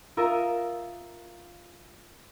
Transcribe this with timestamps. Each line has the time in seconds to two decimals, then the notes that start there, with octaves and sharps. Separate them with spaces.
0.17 F4 A#4 E5 D#6 E6